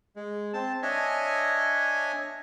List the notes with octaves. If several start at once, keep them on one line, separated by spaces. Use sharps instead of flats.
G#3
C4 A5
D4 C#5 D#5 E5 G#5